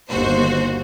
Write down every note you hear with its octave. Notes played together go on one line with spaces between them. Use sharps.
G1 D#2 F#4 C5